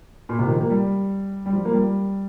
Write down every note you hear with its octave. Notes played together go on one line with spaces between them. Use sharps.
A#2
C3
D#3
F3
A#3
G3
G3
F3
A#3
G3